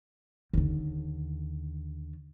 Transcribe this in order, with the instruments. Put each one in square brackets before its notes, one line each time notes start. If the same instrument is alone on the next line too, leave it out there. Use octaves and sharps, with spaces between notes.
[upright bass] D#2 D3